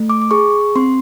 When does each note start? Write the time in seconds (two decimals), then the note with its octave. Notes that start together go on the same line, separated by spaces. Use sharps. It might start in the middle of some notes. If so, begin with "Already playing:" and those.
Already playing: A3
0.09 D6
0.22 D6
0.31 G#4 C#6
0.75 C4 C6